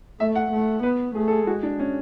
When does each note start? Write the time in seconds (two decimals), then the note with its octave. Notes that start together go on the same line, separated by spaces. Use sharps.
0.20 A3 E5
0.36 F#5
0.52 A3
0.83 B3 B4
1.15 A3 G#4
1.28 A4
1.31 G#4
1.47 G#3 F#4
1.63 D4
1.79 C#4